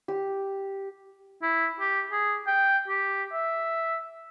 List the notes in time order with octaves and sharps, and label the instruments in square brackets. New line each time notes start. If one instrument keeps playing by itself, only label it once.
[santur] G4
[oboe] E4
G4
G#4
G5
G4
E5